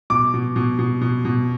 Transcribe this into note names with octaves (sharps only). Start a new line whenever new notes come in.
B2 D6
B2
B2
B2
B2
B2